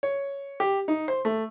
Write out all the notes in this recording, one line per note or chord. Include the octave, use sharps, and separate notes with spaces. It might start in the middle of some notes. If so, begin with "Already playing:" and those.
C#5
G4
D#4
C5
A3